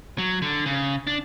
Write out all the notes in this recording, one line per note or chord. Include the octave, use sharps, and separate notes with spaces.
F#3
D3
C#3
D4